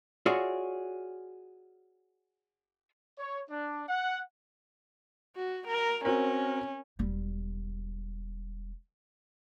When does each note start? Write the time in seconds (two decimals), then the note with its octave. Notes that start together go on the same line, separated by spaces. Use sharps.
0.26 F4 F#4 G#4 C#5 D5 E5
3.18 C#5
3.50 D4
3.88 F#5
5.36 F#4
5.67 A#4
6.05 C4 C#4 F#4 A#4
6.99 E1 G3